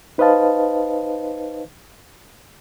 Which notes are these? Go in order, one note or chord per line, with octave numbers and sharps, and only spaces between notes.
D#4 B4 C5 D#5 F5 A5